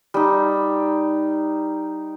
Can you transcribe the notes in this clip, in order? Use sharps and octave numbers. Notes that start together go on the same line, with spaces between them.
G3 D#4